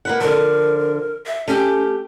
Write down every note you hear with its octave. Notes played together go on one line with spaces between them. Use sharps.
A#3 B4 F#5
D3 F3 A#4
E5
A3 C#4 G4